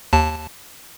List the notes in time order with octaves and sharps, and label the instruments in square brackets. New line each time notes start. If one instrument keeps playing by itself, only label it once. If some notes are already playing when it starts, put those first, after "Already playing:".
[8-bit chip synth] D#2 A5